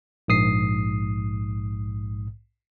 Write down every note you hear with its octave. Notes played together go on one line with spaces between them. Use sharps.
A#1 G#2 D#6 C7